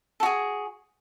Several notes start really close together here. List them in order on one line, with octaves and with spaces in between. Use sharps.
A4 F#4 G#4